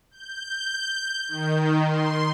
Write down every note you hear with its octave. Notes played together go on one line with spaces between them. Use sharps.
G6
D#3
C6